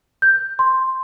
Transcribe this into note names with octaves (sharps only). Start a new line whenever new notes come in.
G6
C6